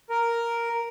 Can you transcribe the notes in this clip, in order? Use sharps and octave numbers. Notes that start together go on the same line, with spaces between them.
A#4